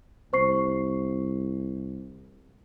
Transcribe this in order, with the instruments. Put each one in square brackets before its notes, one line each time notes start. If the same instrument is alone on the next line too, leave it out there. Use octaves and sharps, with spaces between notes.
[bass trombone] C2 [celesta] C5 C#6 C7